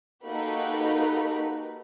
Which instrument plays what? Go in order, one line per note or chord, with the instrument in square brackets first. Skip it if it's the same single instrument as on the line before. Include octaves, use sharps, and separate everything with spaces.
[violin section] A#3 D#4 F#4 G4 A4 B4